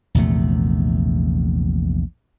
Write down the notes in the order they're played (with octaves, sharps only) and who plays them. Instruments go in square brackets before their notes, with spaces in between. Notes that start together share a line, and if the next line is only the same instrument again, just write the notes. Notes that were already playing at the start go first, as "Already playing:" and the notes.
[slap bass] A#1 E2 C3 A3